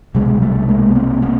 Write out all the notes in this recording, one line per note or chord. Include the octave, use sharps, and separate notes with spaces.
C2 B2 F#3 G#3
G3 A3
G#3 A#3
B3
A#3 C4
A#3 C4